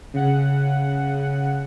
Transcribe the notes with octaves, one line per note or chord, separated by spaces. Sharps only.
C#3 F#5